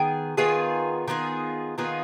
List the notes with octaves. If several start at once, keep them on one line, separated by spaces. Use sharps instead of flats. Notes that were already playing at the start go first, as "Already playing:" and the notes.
Already playing: D#3 B3 G#4 G5
D#3 B3 F4 G#4
D#3 B3 F4 G#4
D#3 B3 F4 G#4